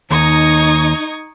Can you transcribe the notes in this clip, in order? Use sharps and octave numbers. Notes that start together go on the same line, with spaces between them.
D#2 D#4 C#6 D#6 G#6